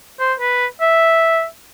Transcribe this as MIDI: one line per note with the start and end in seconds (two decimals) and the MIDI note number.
0.20 0.33 72
0.40 0.66 71
0.81 1.45 76